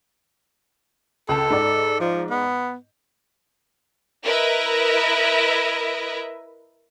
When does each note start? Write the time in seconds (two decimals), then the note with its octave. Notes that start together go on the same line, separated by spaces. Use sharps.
1.29 C#2 A4 A5
1.50 G#2 D5
2.00 F3
2.30 B3
4.25 E4 A#4 B4 D#5 E5